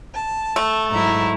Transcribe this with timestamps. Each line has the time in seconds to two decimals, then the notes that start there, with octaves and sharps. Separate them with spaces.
0.14 A5
0.56 A3
0.90 G#2 F#3 E4 A#5